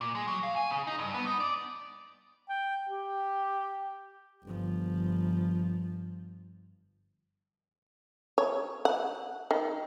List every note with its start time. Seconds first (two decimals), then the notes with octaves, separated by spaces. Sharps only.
0.01 A#2
0.15 G#3
0.27 F#3
0.43 F5
0.56 G#5
0.70 C#3
0.87 D#4
0.99 G2
1.14 B3
1.26 D#4
1.40 D5
2.49 G5
2.89 G4
4.44 G1 F3
8.38 C#5
8.85 F#5
9.51 D#3